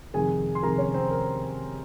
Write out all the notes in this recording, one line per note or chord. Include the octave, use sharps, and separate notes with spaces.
F2 C3 D#3 G#3 G#4 G#5
C6
F2 C3 D#3 G#3 A#4 A#5
C#4 C#5
C4 C5
A#4